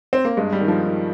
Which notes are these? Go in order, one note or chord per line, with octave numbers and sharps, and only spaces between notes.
C4
A#3
G2 G#3
G3
D#3
F3
D#3